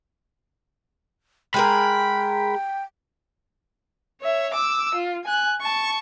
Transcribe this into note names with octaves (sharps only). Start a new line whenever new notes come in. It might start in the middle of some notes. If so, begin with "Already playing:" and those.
G#3 G#4 A#4 G5 B5
C#5 E5
D6 E6
F4
G#5 F#6
A5 C#6